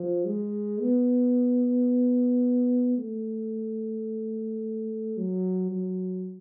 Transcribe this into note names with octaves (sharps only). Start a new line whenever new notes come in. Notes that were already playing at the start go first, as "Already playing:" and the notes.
Already playing: F3
G#3
B3
A3
F#3
F#3